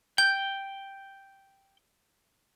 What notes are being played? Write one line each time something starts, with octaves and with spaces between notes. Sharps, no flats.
G5 G6